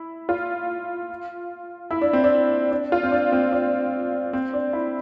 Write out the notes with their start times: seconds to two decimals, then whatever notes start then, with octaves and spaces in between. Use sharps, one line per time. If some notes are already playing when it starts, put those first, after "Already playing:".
Already playing: E4
0.29 F4
1.91 E4
2.01 D4
2.13 C4
2.24 D4
2.71 D4
2.92 F4
3.03 C4
3.12 D4
3.32 C4
3.52 D4
4.33 C4
4.53 D4
4.73 E4